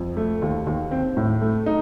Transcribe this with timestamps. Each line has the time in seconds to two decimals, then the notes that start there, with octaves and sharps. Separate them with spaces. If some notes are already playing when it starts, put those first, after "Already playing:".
Already playing: F2
0.17 A3
0.42 D#2
0.67 D#2
0.91 C4
1.17 A2
1.41 A3
1.66 D#4